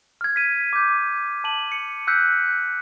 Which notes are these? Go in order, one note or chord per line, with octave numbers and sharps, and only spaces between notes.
F6 G#6
B6 D#7
D6 G6
A5 D#7 F#7
C#7
E6 F#6 G6 B6 C#7